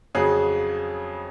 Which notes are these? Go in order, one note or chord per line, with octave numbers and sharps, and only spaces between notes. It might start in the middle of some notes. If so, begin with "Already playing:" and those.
F2 C#3 F#3 G#4